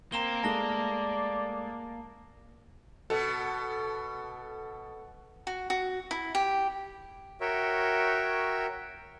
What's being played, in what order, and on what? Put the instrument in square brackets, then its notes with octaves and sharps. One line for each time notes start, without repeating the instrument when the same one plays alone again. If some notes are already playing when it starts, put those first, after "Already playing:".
[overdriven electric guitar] A#3 [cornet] C4 [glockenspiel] A#5 E7 G7
[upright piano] G#3 A3 [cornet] D5 [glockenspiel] A5 A#6 G7
[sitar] B2 [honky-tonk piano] A4
[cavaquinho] F#4
F#4
E4
G4
[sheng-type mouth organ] F#4 A#4 C#5 E5 G5